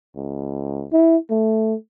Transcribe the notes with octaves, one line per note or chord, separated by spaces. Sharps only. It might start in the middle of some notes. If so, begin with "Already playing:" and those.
C#2
E4
A3